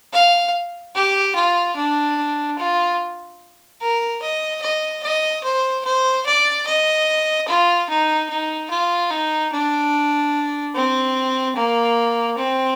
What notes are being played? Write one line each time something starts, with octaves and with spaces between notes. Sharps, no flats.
F5
G4
F4
D4
F4
A#4
D#5
D#5
D#5
C5
C5
D5
D#5
F4
D#4
D#4
F4
D#4
D4
C4
A#3
C4